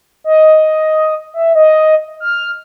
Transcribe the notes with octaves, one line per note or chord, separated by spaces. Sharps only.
D#5
E5
D#5
F6